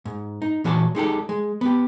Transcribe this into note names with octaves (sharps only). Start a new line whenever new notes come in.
G#2
D#4
A#2 E3 F#4 C#5 A5
G#3 D#4 G4 A4
G#3
B3 G4